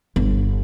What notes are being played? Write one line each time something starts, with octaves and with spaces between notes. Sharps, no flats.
G1